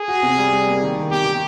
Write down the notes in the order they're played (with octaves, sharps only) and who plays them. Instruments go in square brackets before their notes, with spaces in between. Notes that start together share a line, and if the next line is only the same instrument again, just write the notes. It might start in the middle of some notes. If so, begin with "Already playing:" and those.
Already playing: [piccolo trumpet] G#4
[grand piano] F#4
C3
G3
G3
A#3
D#3
D#3
[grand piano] A#3 [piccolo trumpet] G4
[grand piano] D#3